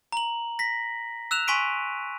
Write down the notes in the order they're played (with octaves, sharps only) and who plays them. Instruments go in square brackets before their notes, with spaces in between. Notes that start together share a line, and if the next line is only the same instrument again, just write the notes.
[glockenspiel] A#5 F#7
A#6 B6
E6 F#6 E7 F7
G#5 C6 C#6 B6 D7 D#7